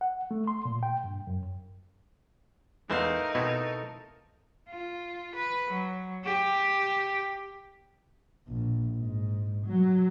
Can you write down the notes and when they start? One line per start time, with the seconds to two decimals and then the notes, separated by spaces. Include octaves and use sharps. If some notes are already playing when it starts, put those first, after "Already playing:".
0.01 F#5
0.31 A3
0.47 C6
0.65 A#2
0.83 G5
1.04 G2
1.27 F#2
2.90 E2 E3 G#3 A3 D#4 A#4 C5 F5
3.35 B2 C4 E4 A4
4.69 F4
5.35 B4
5.71 F#3
6.25 G4
8.47 A#1
8.97 G#2
9.66 F#3